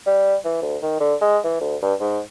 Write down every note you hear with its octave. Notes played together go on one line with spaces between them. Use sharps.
G3
E3
D2
D#3
D3
G#3
E3
D2
G2
G#2